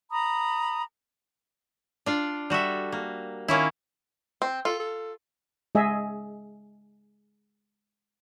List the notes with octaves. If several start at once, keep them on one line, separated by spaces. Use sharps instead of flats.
A#5 B5 D#6
D4 F4 D5
G3 F#4 A4 E5
A#3
D#3 A#3 C#4 E4
C4
F4 A4
A4
G#3 G#4 D#5 E5